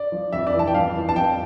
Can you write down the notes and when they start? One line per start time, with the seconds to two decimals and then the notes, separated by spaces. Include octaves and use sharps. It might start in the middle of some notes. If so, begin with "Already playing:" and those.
Already playing: D5
0.12 F3
0.33 F2 E5
0.47 D5
0.54 E3
0.59 A5
0.67 G5
0.74 F2 F5
0.95 E3
1.09 A5
1.16 F2 G5